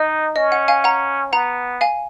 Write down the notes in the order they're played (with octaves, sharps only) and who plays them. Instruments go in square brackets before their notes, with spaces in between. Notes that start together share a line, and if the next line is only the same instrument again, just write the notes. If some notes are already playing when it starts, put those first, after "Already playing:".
Already playing: [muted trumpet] D#4 [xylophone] D#5
[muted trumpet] C#4 [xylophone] D#5
[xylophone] F#5
F5 G#5
F#5 A#5
[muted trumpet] B3 [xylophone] F#5 A#5
[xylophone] F5 G#5